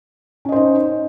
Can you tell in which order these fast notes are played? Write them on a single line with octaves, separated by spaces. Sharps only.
C#4 D#5 C5 D#4